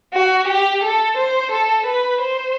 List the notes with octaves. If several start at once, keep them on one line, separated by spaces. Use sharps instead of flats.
F#4
G4
A4
C5
A4
B4
C5